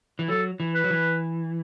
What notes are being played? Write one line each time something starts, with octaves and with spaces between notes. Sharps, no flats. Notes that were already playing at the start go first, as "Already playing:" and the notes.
E3
F#3 A4
E3
B4
F#3
E3